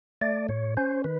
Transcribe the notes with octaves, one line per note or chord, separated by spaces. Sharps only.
A3 D5
A2 C#5
C#4 C5
D#3 B4